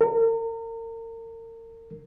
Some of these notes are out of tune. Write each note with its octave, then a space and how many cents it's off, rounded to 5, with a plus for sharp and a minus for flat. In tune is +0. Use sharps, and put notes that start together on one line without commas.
A#4 -35